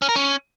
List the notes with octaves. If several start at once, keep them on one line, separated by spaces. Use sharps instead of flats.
C#4
A#4
C#4